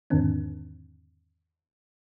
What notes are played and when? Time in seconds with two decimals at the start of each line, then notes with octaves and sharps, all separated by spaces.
0.10 E2 G#2 D3 D#3 C4 D4